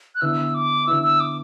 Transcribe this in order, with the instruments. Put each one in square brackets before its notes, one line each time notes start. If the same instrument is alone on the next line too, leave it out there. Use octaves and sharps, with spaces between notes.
[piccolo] F#6
[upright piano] D3 B3 E4 [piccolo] E6
[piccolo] D6
[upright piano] D3 B3 E4 [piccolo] E6
[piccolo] E6
D6